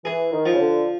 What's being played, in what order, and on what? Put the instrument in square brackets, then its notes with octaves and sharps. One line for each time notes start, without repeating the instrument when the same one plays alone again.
[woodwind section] E3 [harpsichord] G#4
[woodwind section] D#3
[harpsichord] F3
[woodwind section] C#3
D3